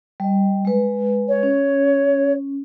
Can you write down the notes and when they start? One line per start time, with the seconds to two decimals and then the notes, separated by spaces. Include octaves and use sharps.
0.20 G3 D#5
0.65 G#3 B4
1.28 C#5
1.43 C#4